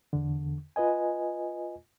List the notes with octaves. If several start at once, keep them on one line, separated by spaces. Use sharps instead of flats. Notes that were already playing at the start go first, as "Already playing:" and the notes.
E2 D3
F4 B4 D#5 G#5